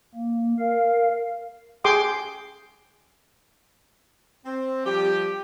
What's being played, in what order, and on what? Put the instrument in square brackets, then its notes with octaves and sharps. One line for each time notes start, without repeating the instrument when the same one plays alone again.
[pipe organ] A#3
A#4 F5
[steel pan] G#4 G5 C6 D6 D#6
[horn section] C4
F3 G3 G4